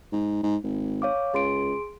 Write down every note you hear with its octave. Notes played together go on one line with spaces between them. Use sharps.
G#2
G#2
G#1
C#5 F5 D6
C#2 G#4 C6 D7